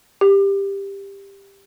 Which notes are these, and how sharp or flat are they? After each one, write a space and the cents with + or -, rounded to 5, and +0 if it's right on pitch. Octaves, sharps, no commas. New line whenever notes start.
G4 +15